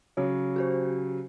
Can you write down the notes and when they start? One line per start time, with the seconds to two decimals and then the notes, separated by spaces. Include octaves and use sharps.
0.17 C#3 F#3 C#5
0.56 F#4 G4 C5